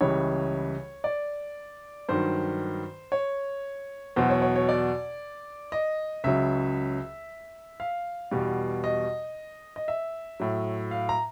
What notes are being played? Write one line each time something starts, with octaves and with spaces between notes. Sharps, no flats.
C#2 C#3 E3 G3 C#5
D5
G2 D#3 F#3 C5
C#5
E2 B2 F#3 C5
C#5
C#5
C#5
D5
D#5
C#2 C#3 F#3 E5
F5
E2 B2 G3
D#5
D#5
E5
A2 F#3
F5
A#5